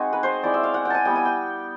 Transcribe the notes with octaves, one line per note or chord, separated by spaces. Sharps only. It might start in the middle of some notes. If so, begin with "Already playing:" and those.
Already playing: G#3 C4 D#4 F#4 G#4
B4
C5
G#3 C4 E4 D5
E5
F5
F#5
G5
G#5 A5
G3 B3 E4 G5
G#5
G5